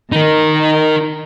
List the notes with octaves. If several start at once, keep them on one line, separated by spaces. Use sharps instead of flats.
D#3 D#4 A#4